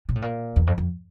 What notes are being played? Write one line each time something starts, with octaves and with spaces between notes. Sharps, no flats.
A#2
A2
A#2
E2
F2
F2